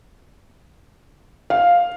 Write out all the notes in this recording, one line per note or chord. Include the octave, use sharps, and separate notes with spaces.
F5